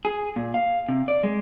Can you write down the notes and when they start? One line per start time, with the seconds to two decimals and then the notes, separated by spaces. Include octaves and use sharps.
0.05 G#4
0.36 A#2
0.54 F5
0.89 C3
1.08 D5
1.23 G#3